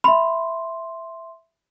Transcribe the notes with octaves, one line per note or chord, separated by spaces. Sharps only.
E5 B5 C6